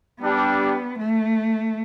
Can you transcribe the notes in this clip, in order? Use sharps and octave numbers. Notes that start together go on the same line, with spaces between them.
G3 B3 D4 G4
A3